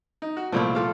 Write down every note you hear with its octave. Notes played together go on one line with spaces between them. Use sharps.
D#4
F#4
C2 A#2 F3 A3 E4
F4 A4 F5